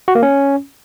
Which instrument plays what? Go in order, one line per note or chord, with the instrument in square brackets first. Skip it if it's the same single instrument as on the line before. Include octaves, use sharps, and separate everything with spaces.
[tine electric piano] F#4
A#3
C#4